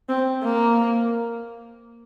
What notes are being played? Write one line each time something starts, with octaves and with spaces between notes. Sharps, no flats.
C4
A#3